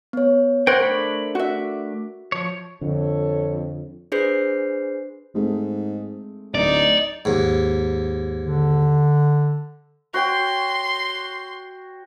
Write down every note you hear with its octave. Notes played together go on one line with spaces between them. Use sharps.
B3 C#5
C5 F#5 G5 C#6 G#6 A#6
A3 D4 A#4 B5
F#4 E5
F3 C#5
F2 D3 A4 C#5
D4 G#4 B4 C5 G6 C7
G#2 G#3 A3 C4
D1 D#4 D5
D#2 G#2
D3
F#4 C#5 G5 C6